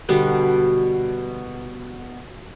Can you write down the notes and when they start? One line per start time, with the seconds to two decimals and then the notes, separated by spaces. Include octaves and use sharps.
0.09 B2 D3 G3 B3